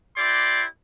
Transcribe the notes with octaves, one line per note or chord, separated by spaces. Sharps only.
E4 G4 D5 C6